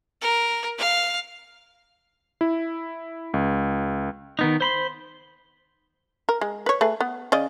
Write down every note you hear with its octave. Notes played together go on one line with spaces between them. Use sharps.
A#4
F5
E4
C#2
D#3 B3 D#4
C5 B5 C6
A#4
G#3
B4 C#5
A3 G#4 B4
B3
C#3 D5 D#5